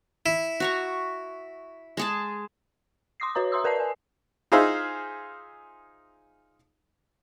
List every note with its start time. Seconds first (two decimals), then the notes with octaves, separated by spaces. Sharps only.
0.26 E4
0.60 F#4 A#5 C#6
1.97 G#3 G#4 A5
3.20 C6 D6 D#6 A#6 C7
3.35 F#4 B4 C#5 A#5 D#6
3.52 E5 A#5 C6 D#6 E6
3.64 A#4 B4 D5 A5 C7
3.80 G#5
4.52 D#4 F4 G#4 C5 E5 F5